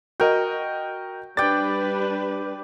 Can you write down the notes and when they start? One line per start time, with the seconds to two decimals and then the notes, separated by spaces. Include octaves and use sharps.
0.20 F#4 A#4 D#5 G5
1.37 G3 D4 B4 D5 G5 A6